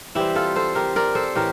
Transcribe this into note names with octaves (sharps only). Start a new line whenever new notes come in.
E3 G3 C4 E4 G4
F4 A4
A4 C5
G4 A#4
A#4 D5
A4 C5
A2 E3 G4 A#4